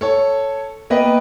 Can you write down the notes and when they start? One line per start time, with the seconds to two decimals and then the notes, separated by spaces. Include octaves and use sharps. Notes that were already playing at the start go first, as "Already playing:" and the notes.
0.01 A4 C#5
0.90 A#3 B3 B4 D#5 G5